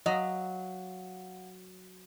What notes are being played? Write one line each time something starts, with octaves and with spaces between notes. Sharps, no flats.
F#3 D#5 F5 F#5